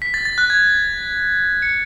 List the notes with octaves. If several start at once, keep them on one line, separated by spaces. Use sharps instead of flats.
B6
A6
A6
F#6
G#6
C#7